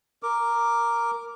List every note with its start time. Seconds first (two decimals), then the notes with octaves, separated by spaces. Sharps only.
0.23 A#4 D6